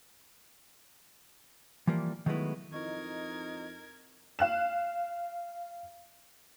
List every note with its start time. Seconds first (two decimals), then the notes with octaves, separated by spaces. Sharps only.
1.87 E3 F3 G3 A#3
2.26 D#3 F#3 G#3 A3 B3 E4
2.73 F2 D#4 E4 A#4 D#5 C#6 G#6
4.39 F5 F#6 E7